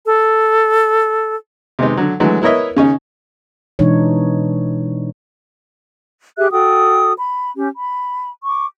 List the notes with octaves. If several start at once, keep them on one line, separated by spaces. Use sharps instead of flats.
A4
C3 G#3 B3 D#4
D3 F#3
D3 E3 F#3 G#3 A3
B3 E4 A#4 C#5 D#5 E5
C#3 C#4 D#4
B2 E3 G#3 D4 D#4 C#5
G4 G#4 E5 F#6
F#4 A4 G5 D#6
B5
C#4 G4
B5
C#6 D6